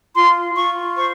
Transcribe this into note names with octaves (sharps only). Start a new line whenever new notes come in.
F4 C6
F4 C#6
C5 C#6